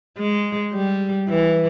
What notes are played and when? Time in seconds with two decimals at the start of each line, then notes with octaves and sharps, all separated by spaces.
0.18 G#3
0.74 G3
1.29 E3